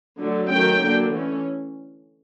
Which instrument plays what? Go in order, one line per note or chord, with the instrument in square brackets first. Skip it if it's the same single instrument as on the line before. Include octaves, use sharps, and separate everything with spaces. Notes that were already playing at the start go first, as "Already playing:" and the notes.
[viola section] D3 F#3 A3
D#3 F#3 A3 C#4 G5
D3 F#3 A#3 D4
E3 A3 C#4